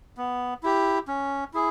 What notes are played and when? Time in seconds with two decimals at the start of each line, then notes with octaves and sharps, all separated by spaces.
0.17 B3
0.63 E4 G4
1.08 C#4
1.54 E4 G#4